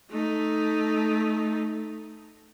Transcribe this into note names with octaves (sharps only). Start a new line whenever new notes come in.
A3 D#4